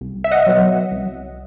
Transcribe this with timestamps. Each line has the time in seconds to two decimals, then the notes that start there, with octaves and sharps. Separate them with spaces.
0.01 C2
0.24 E5
0.31 D#5 F#5
0.46 B2 F#3
0.92 C2